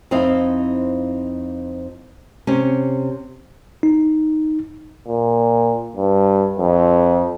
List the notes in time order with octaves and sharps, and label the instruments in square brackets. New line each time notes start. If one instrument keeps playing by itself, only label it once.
[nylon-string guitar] F2 C4 D#4 E4 F5
C3 C#4
[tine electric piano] D#4
[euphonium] A#2
G2
F2